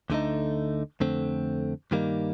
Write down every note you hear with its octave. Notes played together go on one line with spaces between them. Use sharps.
D2 D3 A3 D#4
F2 D3 A3 C4
G2 D#3 G3 A#3 D#4